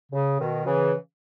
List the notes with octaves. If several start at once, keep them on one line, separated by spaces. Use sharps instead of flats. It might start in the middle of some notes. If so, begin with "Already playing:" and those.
C#3
B2 D#3
C#3 E3